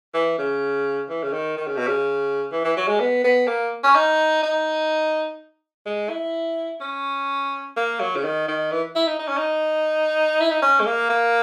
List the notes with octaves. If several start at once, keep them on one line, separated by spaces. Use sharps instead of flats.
E3
C#3
E3
C#3
D#3
D#3
C#3
B2
C#3
E3
E3
F#3
G#3
B3
B3
A#3
C#4
D#4
D#4
G#3
E4
C#4
A#3
F#3
C#3
D#3
D#3
E3
E4
D#4
D#4
C#4
D#4
E4
D#4
C#4
G#3
A#3
A#3